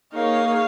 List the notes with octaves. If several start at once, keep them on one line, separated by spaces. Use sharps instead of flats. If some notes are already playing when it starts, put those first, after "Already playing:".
A#3 D#4 G#4 C#5 F5